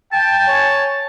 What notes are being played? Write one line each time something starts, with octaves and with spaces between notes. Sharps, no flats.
G5 A5
C#5 G#5